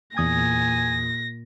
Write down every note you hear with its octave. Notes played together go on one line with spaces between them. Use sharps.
E2 A#2 G#5 D#6 G#6 A#6